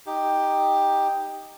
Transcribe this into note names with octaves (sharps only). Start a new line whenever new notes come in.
D#4 G4